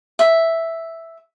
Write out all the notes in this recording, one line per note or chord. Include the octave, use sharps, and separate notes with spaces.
E5